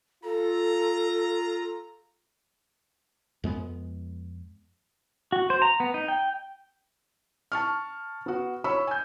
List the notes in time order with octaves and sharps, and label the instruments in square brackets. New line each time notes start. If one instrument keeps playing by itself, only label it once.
[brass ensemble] F4 [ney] A4 [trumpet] A#5
[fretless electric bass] F2 G#3 B3
[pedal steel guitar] F#4
C5
A#5
B3
D#4
G5
[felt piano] A5 C#6 F6
B3 F#4
C#5 B5 C#6 E6
G#5 G6